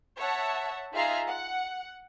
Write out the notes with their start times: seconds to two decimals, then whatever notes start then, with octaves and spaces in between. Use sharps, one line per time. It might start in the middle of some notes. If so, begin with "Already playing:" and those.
0.19 C#5 E5 F#5 A5
0.93 D#4 F4 G#4 E5 F5 A#5
1.25 F#5